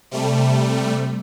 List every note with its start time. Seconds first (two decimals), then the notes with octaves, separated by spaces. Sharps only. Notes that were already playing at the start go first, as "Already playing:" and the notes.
0.11 C3 G3 A3